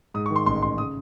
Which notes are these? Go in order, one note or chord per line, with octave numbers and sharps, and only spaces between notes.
G#2 D#6
C#6
D#3
C6
A1 C6
A1 C6
C#3 D#6